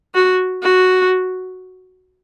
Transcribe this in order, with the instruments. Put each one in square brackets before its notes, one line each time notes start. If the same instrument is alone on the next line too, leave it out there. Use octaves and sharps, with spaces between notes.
[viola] F#4
F#4